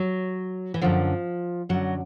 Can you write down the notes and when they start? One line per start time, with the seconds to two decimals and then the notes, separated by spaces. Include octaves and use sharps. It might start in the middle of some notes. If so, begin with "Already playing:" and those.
Already playing: F#3
0.74 E3
0.81 F#2 D3 F3
1.69 F#2 D3 F#3